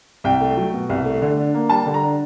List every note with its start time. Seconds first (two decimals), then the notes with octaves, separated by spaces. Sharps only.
0.24 C2 G5
0.41 A3
0.57 F#3
0.74 B2
0.90 C2
1.05 A3
1.22 D3
1.38 D4
1.54 A#3
1.70 G3 A5
1.86 D3
1.94 A#5
2.03 D4